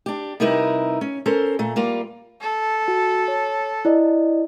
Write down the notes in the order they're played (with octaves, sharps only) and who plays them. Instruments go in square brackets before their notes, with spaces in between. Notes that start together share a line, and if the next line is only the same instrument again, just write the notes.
[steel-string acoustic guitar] D4 G4
C3 G3 D#4 E4 A#4 B4
C#4
C#4 A4 A#4 C5
A#2 A3
G3 A#3 F4
[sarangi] A4
[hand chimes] F#4
C#5
E4 D5 D#5